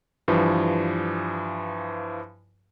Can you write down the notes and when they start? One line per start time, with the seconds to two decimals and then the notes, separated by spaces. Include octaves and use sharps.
0.28 G2 E3 F3